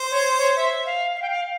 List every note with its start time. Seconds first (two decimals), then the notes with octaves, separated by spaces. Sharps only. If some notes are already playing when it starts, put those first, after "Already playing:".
Already playing: C5
0.11 C#5
0.38 C#5
0.56 E5
0.86 F5
1.16 F5
1.22 G5
1.30 F5